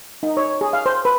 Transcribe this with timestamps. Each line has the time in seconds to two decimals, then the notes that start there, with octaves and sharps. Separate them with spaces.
0.23 D#4
0.37 C#5
0.61 G#4
0.73 F5
0.86 C5
1.05 B4